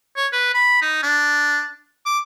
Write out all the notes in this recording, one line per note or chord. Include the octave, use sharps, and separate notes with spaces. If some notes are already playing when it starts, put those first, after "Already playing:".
C#5
B4
B5
D#4
D4
D6